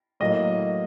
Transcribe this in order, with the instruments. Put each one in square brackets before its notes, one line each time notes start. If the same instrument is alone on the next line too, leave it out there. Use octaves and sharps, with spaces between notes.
[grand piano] A2 F#3 A#3 D#5